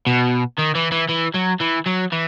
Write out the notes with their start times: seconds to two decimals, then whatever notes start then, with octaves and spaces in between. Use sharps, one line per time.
0.07 B2
0.58 D#3
0.75 E3
0.92 E3
1.09 E3
1.35 F#3
1.61 E3
1.86 F#3
2.13 E3